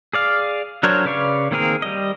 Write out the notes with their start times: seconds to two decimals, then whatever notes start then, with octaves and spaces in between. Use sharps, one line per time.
0.13 G#4 D5 F5
0.83 F#3 D4 A#4 C5 C#5
1.05 C#3 B4 D5 F5 C#6
1.51 D#3 A#3 C4 G#4 A#4
1.82 G3 D#5